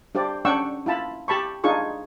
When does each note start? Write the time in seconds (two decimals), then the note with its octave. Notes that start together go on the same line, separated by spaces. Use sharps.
0.15 D4 G4 C5 D5
0.45 C#4 D4 F#5 G5 C#6 E6
0.86 E4 F4 A5 B5
1.28 G4 A5 B5 C#6
1.64 D4 D#4 F4 G#4 C#6